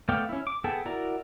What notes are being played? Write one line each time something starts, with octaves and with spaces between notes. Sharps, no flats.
A3 B3 D5 F5 G5
C#4 E4
D6
B3 G#4 A4 G5 A5
E4 F#4 A#4 D5 A#5